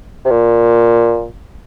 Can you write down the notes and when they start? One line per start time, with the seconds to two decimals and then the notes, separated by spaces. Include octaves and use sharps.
0.25 C3
0.31 A#2